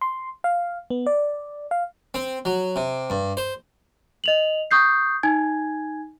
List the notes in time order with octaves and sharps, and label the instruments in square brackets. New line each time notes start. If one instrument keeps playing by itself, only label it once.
[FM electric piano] C6
F5
B3
D5
F5
[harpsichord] C4
F#3
C3
G2
C5
[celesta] D#5 F7 F#7
C#6 D#6 G6 C7
D#4 G#5 G#6